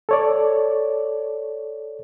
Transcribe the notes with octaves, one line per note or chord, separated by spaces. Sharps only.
A4 C#5 D5